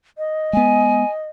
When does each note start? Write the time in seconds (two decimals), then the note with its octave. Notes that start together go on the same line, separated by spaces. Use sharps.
0.18 D#5
0.53 G#3 B3 G#5